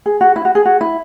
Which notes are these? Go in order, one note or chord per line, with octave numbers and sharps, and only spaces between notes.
G#4
F#4
E4
F#4
G#4
F#4
E4